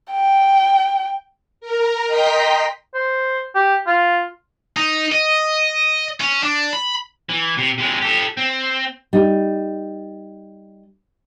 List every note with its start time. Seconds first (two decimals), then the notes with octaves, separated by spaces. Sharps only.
0.12 G5
1.61 A#4
2.06 D#5 G5 A#5 C6 B6
2.94 C5
3.55 G4
3.87 F4
4.77 D#4
5.12 D#5
6.21 C#4
6.43 D4
6.73 B5
7.29 E3
7.57 C3
7.78 C3 G#3
8.02 G4 A4
8.37 C4
9.13 G3 D#4